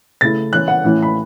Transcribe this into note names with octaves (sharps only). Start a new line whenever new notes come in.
C#3 A3 E4 A6
E3 C#4 E4 F#6
F#5
A2 E3 C#4 E4
B5